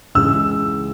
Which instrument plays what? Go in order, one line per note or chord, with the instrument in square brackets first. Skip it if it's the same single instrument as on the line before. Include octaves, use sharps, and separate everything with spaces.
[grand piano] C#2 C#3 E3 G#3 E6